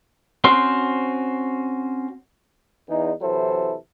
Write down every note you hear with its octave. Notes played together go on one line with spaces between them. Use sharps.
C4 C#4 F#4 C5
E2 D#4
C3 E3 F#3 E4 A4 C5